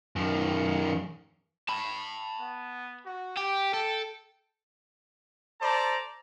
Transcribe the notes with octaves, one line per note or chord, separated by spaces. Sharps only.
F#2 D#3
A5 B5
B3
F#4
G4 G5
A4
A4 C5 D5 A5 A#5